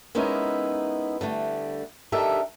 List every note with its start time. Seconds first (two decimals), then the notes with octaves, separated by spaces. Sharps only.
0.15 G#3 B3 C#4 D#4 E4 A#4
1.21 D3 G3 A3
2.12 D4 D#4 G4 A4 A#4 E5